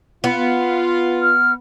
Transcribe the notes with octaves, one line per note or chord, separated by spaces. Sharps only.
B3 F4
F6